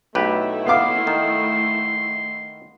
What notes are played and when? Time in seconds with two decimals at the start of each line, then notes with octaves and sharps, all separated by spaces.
0.15 B1 A3 E4 G4 B4
0.66 B3 F5 C6 D6
1.07 D#3